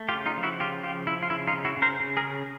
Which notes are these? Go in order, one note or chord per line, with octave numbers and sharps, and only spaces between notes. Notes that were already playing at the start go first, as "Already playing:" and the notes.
Already playing: A3
F4 G4
C#3
D#4 F4
F3
E4 F#4
C#3 F4 G4
F3 F4 G4
F3 E4
F4
C#3 E4
D#4 F4
C#3
E4 F#4
C#3
A#4 C5
C#3
G#4 A#4
C#3